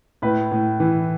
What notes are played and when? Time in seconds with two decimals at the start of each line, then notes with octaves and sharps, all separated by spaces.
0.22 A2 B4
0.51 A2
0.80 E3